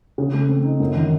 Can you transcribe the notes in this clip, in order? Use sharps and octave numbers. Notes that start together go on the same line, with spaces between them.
C#3
A3
C4
D#4
F#2
D#3